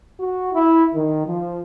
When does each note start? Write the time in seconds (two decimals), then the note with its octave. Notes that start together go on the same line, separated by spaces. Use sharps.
0.20 F#4
0.54 E4
0.95 D#3
1.27 F3